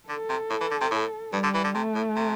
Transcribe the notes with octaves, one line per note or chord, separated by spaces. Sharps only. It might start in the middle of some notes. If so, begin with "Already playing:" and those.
D3 A4
C3
A2
E3
D3
C3
A2
G2 G3
D3
E3
D3
C3 A3
A2
C3